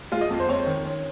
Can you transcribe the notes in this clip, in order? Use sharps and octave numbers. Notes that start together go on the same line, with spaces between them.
G#3 F4
D#5
F2
C5
C4 C#5
D#3
C#4